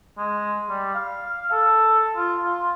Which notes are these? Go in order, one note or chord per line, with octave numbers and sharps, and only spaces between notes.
G#3
G3
F5
A4
F4
F4